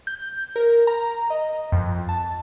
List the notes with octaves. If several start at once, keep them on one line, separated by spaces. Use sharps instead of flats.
G6
A#4
A#5
D#5
F2
A5